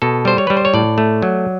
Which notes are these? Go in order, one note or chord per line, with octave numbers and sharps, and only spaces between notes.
B2 A4
G3 C5
C#5
G3 B4
C5
C#5
A2 D5
A3
F#3